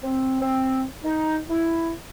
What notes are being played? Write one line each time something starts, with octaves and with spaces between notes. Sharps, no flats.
C4
C4
D#4
E4